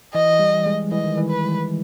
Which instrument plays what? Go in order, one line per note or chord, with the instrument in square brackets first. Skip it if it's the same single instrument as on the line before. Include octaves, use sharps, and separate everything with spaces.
[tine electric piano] E3 [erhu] D#5
[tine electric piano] G3
G#3
[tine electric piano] E3 [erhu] D#5
[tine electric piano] D#3
E3
[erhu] B4